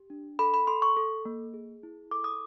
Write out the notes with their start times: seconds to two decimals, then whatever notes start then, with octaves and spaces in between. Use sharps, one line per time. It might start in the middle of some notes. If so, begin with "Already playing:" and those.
Already playing: G4
0.10 D4
0.39 A4 B5
0.54 B5
0.67 A4 C6
0.82 C#6
0.97 A4
1.25 A#3
1.54 G#4
1.83 E4
2.11 A4 D6
2.24 D#6